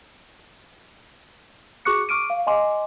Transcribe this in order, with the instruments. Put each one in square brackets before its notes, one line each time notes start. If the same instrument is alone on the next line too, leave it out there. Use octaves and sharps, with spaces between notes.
[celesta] F#4 G#4 C#6 D6 F#6 C#7
C#6 D6 F6 D7 D#7
F5
D#5 G#5 C6 D6